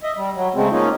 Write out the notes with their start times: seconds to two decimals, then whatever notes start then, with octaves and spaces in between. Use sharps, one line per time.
0.03 D#5 E5
0.17 G3
0.35 F#3
0.55 C#3 G#3 A3 C4
0.71 A#3 C#4 D#4 F4